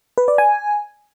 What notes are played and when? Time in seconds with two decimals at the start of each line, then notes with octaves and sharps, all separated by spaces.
0.18 B4
0.28 D5
0.38 G#5